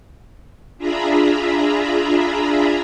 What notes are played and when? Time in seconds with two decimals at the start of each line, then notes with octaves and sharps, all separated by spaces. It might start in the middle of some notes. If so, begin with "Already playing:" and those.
0.78 D4 F4 G#4 E5 A#5 B5